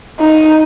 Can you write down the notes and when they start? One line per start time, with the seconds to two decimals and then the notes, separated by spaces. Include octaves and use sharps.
0.20 D#4